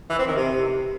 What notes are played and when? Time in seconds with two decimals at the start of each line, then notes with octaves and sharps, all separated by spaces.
0.10 E3
0.18 C4
0.27 D#3
0.36 C3